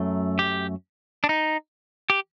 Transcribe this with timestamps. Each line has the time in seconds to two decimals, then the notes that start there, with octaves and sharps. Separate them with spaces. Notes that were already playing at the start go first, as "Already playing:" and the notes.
Already playing: F#2 F#3 A3
0.39 G4
1.24 D4
1.29 D#4
2.10 G4